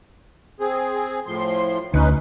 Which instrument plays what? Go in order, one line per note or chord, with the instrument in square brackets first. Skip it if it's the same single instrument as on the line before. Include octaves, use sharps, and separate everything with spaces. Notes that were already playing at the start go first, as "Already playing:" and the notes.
[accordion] C4 G#4
A2 F3 C6
[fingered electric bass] D2 [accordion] C#4 D#4 B4